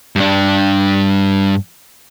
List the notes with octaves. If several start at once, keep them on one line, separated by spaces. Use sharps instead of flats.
G2 D4